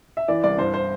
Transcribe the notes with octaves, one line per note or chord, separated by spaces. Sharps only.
E5
E3 D5
C2 D5
G2 C5
C5